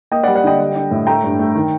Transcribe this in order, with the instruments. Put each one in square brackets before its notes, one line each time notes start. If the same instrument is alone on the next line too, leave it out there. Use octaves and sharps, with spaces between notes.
[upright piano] A#3 D#5 G5
D5 F#5
G3
D5 F#5
D3 D#5 G5
G3
D4
A2
A3 G5 A#5
G2
A3
D#3